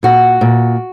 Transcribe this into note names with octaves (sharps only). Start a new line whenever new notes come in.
A#2 F#4
A#2